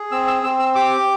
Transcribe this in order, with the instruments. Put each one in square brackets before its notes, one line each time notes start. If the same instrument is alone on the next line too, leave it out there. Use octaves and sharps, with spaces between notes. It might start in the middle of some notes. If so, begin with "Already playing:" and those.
Already playing: [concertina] G#4
C4 E6
E6
C4 E6
E6
G4 D6